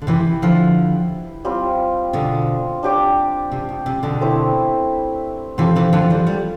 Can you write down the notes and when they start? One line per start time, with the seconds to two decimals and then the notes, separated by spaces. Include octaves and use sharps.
0.02 D3
0.07 C3 E3 E4 G4 B4
0.42 D3 F3
1.45 G3 C4 F4
2.13 B2 D3
2.83 D4 G4 D5
3.52 C3
3.69 B2
3.86 C3
4.03 B2 D3
4.21 A3 C4 E4 B4
5.58 C3 E3 C4 F4 A4 C5
5.76 C3 E3
5.93 D3 F3
6.10 E3 G3
6.27 G3 B3